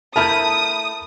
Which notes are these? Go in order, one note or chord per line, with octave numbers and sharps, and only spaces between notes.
A3 E4 A#4 A5 B5 D#6 G6